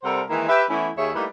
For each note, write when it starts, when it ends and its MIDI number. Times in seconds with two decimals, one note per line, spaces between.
0.03 0.21 48
0.03 0.21 55
0.03 0.21 69
0.03 0.21 70
0.03 0.21 72
0.03 0.21 78
0.28 0.47 51
0.28 0.47 52
0.28 0.47 56
0.28 0.47 58
0.28 0.47 64
0.48 0.63 67
0.48 0.63 71
0.48 0.63 76
0.69 0.89 52
0.69 0.89 57
0.69 0.89 59
0.69 0.89 61
0.69 0.89 64
0.97 1.09 39
0.97 1.09 51
0.97 1.09 68
0.97 1.09 73
0.97 1.09 76
1.14 1.24 55
1.14 1.24 57
1.14 1.24 58
1.14 1.24 63
1.14 1.24 64
1.14 1.24 71